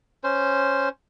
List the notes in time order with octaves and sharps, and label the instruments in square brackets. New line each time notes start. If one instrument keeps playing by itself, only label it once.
[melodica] C#4 C5